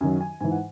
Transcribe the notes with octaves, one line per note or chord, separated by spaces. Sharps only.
F#2 D#3 F#3 G#5
G#5
G#2 E3 G#5
F#5